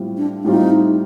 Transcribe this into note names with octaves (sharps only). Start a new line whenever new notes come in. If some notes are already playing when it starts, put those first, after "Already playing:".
Already playing: A2 G3 C4 F4
D4
A2 G3 C4 D#4 F4